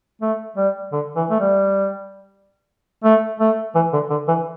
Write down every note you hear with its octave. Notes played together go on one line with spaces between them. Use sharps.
A3
G3
D3
E3
A3
G3
A3
A3
E3
D3
D3
E3